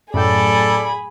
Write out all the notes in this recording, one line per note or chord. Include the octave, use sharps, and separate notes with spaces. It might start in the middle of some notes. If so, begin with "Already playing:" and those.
F#2 A2 G#4 A4 D5 G5 B5